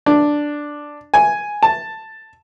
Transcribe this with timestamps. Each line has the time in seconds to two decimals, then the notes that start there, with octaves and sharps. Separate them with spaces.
0.06 D4
1.14 G#5
1.63 A5